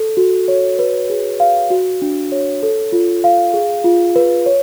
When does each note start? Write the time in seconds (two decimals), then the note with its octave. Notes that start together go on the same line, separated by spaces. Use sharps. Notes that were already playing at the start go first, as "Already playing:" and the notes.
Already playing: A4
0.17 F#4
0.48 C#5
0.79 B4
1.10 G#4
1.40 F5
1.70 F#4
2.02 D4
2.32 C#5
2.63 A4
2.92 F4
3.24 F5
3.54 G#4
3.84 F4
4.16 B4
4.46 C#5